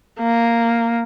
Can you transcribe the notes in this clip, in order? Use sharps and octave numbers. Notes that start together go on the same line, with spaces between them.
A#3